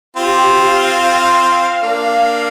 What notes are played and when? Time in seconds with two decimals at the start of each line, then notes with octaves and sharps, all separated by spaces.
0.16 C4 F4 G4
0.58 F5
0.99 F5
1.83 A#3 D4